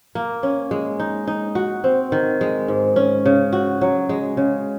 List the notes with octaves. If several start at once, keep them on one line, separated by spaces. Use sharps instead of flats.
A#3
C#4
G#3
D#4
D#4
F#4
C4
D#3
G#3
G#2
C#4
C#3
F#4
F#3
G#3
C#3